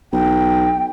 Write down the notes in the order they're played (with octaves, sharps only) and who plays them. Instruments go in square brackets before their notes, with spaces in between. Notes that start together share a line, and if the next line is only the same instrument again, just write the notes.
[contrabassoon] B1 [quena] G5